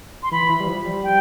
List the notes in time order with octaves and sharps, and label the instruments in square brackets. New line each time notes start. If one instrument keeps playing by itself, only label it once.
[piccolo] C6
[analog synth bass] E3 [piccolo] B5
[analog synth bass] E3
G3
F3
G3
[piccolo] G5